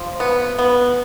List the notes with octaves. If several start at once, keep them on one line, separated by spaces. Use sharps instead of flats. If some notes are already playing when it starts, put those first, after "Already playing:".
Already playing: F3
B3
B3